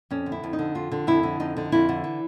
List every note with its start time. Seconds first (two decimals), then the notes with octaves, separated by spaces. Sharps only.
0.10 F2 C#4
0.26 D3
0.32 E4
0.44 F2
0.53 D#4
0.59 D3
0.75 F2 F4
0.91 D3
1.07 F2 E4
1.23 D3
1.40 F2 D#4
1.57 D3
1.72 F2 E4
1.89 D3
2.04 E3